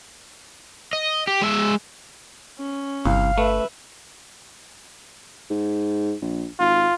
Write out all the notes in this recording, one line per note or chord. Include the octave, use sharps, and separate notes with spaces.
D#5
G4
G#3 E5
C#4
G1 C2 F5
A3 B4 E5
G#2
A#1
G#1 F4